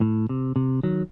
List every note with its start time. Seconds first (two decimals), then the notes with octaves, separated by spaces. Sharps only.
0.01 A2
0.29 C3
0.56 C3
0.83 D#3 F#3